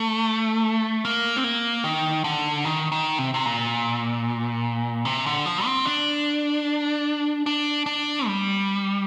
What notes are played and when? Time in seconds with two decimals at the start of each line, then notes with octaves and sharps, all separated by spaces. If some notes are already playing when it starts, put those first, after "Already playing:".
Already playing: A3
1.05 A#3
1.36 C4
1.44 A#3
1.84 D#3
2.24 D3
2.65 D#3
2.92 D#3
3.19 C3
3.34 C3
3.46 A#2
5.05 C3
5.26 D3
5.46 F3
5.66 C4
5.85 D4
7.46 D4
7.86 D4
8.27 G3